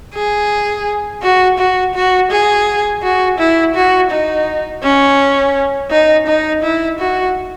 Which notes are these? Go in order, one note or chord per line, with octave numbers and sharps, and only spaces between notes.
G#4
F#4
F#4
F#4
G#4
F#4
E4
F#4
D#4
C#4
D#4
D#4
E4
F#4